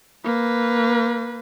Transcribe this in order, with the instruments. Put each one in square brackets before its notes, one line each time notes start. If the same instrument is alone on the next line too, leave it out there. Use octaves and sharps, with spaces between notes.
[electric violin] A#3 B4